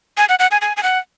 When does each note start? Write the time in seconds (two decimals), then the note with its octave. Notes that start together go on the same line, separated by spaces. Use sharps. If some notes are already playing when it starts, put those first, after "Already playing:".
0.17 G#5
0.29 F#5
0.39 F#5
0.51 G#5
0.61 G#5
0.77 G#5
0.83 F#5